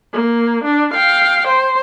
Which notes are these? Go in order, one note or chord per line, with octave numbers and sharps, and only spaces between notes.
A#3
D4
F5 G5
C5